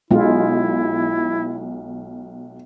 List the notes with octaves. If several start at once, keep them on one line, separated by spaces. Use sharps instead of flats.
B1 G#3 E4 F4